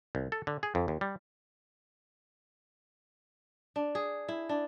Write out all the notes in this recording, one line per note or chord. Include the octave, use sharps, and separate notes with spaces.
C2
A4
D3
G#4
F2
D#2
G3
D4
G#4
E4
D4